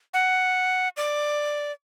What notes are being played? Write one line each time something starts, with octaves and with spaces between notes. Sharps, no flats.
F#5
D5